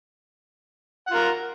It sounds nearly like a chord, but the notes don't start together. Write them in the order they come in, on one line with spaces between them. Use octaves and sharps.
F#5 F4 A#4